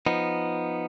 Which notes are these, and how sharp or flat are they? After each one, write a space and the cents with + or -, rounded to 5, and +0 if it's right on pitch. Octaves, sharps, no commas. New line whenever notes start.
F3 +0 B3 +0 D#4 +0